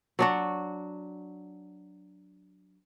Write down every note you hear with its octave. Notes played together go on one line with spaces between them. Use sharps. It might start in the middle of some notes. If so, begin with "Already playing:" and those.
F#3 D4 F#4